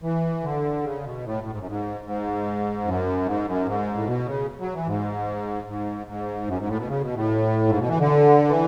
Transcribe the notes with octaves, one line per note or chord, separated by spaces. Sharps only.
E3
D3
C#3
B2
A2
A2
G#2
F#2
G#2
G#2
F#2
G#2
F#2
G#2
A2
B2
C#3
F#3
E3
G#2
G#2
G#2
F#2
G#2
A2
B2
C#3
B2
A2
G#2
B2
E3
D3
E3